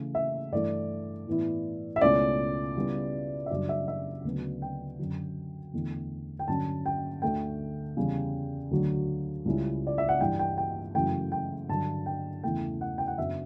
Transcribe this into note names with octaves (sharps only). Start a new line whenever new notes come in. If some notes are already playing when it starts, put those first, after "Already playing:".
Already playing: C#3 E3 A3
E5
G2 E3 A3 D5
A2 E3 B3 E4
E5
C#2 B2 A3 C#4 E4 D5
C#3 G3 B3 E4
E5
F#2 C#3 G3 D4 D5
E5
E5
D2 C#3 F#3 B3
G5
F#2 D3 F#3
E2 D3 A3
G5
G2 D3 F#3 C#4 A5
G5
D2 D3 A3 G5
E2 C#3 G3
D2 D3 F#3
C#2 C#3 G3 C#4 E4
D5
E5
F#5
G2 E3 G3 D4 G5
G5
G5
F#2 C#3 E3 A3 G5
G5
G2 D3 F#3 A5
G5
E2 C#3 E3 A3 E4 G5
F#5
G5
F#5
F#2 C#3 F#3 B3 D4 E5